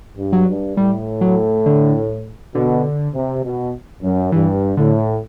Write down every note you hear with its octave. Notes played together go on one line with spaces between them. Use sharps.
G2
F#3
G2
A2 G3
F#3
D3
B2 D3
C3
B2
F#2
G2 E3
A2 D3